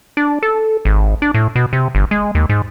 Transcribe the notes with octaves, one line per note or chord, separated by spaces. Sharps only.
D4
A4
G#1
D4
A2
B2
C3
G1
G#3
D#2
G#2